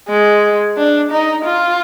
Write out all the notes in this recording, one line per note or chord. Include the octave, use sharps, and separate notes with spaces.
G#3
D4
D#4
F4